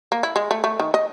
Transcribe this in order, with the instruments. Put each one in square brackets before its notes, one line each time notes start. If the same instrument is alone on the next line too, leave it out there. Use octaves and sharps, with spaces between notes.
[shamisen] A#3
E4
G#3
A3
A3
D#3
D#5